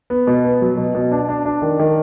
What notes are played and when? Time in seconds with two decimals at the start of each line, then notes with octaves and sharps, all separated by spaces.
0.10 B3
0.27 B2
0.44 B3
0.61 F#3
0.77 B2
0.95 B2
1.12 D4
1.29 D4
1.45 D4
1.62 D#3
1.79 D#3